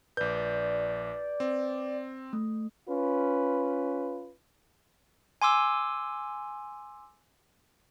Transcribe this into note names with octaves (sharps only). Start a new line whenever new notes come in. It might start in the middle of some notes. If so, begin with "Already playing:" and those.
A#1 B4 D5 G6
C4
A3
C#4 F4 B4
G#5 C6 D6 E6